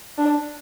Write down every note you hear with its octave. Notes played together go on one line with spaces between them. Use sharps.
D4